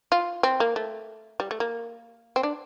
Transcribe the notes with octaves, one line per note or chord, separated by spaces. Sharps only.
F4
C4
A#3
A3
G3
A3
A#3
C4
D4